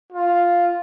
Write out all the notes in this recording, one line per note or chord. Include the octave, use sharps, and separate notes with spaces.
F4